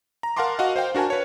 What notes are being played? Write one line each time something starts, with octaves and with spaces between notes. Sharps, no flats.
A#5
A#4 F5 F#5 A5 C6 D6
F#4 D#5 F5 F#5
C5 F5 G5
D4 F#4 A#4 G#5 A5
B4 C#5